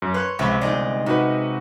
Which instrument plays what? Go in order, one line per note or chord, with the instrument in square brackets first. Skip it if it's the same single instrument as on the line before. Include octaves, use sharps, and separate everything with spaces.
[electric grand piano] F#2
[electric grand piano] B4 C6 F#6 [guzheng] C#5
[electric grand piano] C#2 B5 [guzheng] C3 F3 A3
[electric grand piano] G1 D5 [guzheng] G#3 D#4
[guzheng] C3 [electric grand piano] D#4 F#4 B4